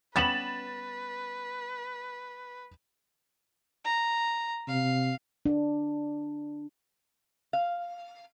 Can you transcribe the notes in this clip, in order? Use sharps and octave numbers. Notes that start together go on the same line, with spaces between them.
G3 B3 C#4 B4 A6 E7 F#7
A#5
C3 F5
D4
F5